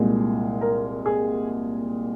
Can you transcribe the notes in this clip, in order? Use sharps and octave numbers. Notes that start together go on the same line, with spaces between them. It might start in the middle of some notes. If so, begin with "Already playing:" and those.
Already playing: C2 A#2 G#3
A#4
G#4